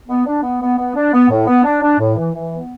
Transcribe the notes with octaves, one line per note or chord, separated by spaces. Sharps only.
B3
D4
B3
B3
B3
D4
B3
A2
B3
D4
D4
A2
E3
E3
B3